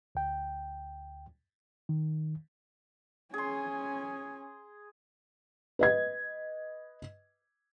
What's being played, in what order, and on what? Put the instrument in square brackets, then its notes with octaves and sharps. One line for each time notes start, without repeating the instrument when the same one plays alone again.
[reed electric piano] D2 G5
D#3
[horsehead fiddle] C#4 G#5 [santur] G#4 C6
[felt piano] B4 D#5 G#6